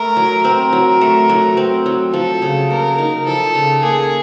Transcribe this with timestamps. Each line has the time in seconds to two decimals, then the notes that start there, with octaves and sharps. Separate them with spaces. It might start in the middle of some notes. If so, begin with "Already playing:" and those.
Already playing: A3 A#4
0.17 F#3
0.44 C4 A#4
0.72 F#3
1.01 A3
1.29 F#3
1.57 C4
1.86 F#3
2.13 F3 A4
2.42 C#3
2.70 A#3 A#4
2.98 D#4
3.26 F3 A4
3.55 C#3
3.83 A#3 G#4